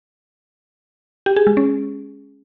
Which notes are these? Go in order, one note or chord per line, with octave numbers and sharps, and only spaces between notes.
G4
G#4
G#3
C#4